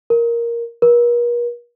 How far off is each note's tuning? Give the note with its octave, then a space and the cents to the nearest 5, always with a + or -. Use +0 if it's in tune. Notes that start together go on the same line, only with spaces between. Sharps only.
A#4 +5
A#4 +45